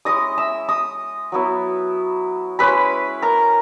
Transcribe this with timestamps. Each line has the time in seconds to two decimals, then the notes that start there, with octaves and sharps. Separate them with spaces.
0.05 G#3 C#4 E4 D#5 D#6
0.38 E5 E6
0.69 D#5 D#6
1.32 F#3 B3 E4
2.59 G#3 C#4 E4 B4 B5
3.22 A#4 A#5